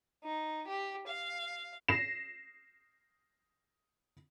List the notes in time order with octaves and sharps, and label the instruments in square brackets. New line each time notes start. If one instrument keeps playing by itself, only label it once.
[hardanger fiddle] D#4
G4
F5
[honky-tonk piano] A#6 C7 E7